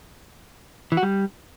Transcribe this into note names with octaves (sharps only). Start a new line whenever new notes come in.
E3
F#4
G3